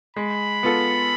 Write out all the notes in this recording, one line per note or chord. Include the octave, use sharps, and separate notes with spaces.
G#3 B5
B3 F4 A4